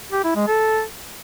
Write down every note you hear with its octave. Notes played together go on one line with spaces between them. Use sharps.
G4
E4
G#3
A4